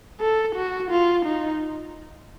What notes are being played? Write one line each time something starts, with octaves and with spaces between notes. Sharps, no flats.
A4
F#4
F4
D#4